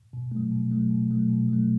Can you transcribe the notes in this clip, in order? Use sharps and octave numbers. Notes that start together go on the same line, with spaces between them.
B2
F#3 A3
B2
F#3 A3
B2
F#3 A3
B2
F#3 A3